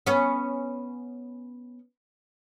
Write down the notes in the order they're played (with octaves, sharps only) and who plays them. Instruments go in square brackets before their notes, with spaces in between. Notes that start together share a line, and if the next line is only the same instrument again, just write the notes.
[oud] B3 C#4